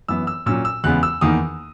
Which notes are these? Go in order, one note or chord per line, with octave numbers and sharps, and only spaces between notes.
F#2 E3 B3 E6
E6
A#2 F#3 C#4 E6
E6
E2 C#3 G#3 B3 F#6
E6
E2 D#3 A#3 D#6